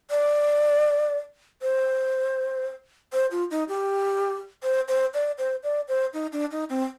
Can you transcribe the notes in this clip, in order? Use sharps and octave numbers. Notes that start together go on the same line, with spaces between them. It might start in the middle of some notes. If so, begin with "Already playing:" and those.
D5
C5
C5
F4
D#4
G4
C5
C5
D5
C5
D5
C5
D#4
D4
D#4
C4